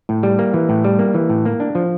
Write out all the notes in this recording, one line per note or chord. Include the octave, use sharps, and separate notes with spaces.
A2
G3
A#3
E3
A2
G3
A#3
E3
A2
A#3
D4
F3